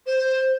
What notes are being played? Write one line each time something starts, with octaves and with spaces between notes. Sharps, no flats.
C5